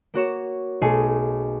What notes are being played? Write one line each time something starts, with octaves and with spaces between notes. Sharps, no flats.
A#3 F#4 C#5 E7
B1 B2 A3 G#4 D#7